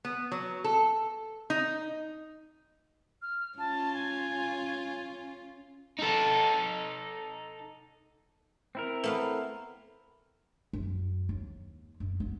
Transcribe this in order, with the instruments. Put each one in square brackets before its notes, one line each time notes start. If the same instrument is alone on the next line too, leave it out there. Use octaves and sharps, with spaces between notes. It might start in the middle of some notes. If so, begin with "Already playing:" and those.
[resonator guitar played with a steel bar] B3
F#3
A4
D#4
[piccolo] F6
[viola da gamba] C#4 F4 [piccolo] A5
[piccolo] G#5
[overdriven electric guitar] D#4 A4
[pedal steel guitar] C4 E4 A#4
[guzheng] A3 B3 F5 [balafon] B4
[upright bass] F#2
D#2
F#2
B3